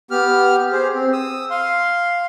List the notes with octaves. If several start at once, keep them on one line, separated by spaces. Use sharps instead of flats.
B3 G4 F6
G4 G#4 C5
C4
D#6 E6
F5 C6